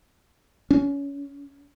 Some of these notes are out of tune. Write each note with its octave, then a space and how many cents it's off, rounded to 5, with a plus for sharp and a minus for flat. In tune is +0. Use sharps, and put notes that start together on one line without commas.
C#4 +25